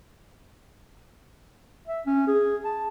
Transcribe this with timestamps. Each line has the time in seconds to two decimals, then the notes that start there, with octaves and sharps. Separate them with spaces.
1.88 E5
2.07 C#4
2.28 G#4
2.65 A5